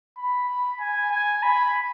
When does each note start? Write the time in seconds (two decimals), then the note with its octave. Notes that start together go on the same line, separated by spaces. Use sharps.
0.18 B5
0.80 G#5
1.12 G#5
1.43 B5